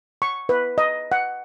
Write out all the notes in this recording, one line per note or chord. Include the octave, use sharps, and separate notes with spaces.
C#6
B4
D#5
F#5